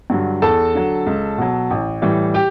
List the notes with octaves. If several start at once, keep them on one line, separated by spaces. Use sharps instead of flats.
G2 D3 F#3
E2 A4 A5
D3 F#3
C#2
B2 F#3
A1
A2 E3 G3
G4 G5